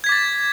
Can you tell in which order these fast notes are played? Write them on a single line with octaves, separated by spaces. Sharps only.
G#6 B6 D6 A6